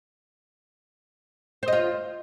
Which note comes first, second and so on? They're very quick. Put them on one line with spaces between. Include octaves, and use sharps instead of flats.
C5 D#5 F4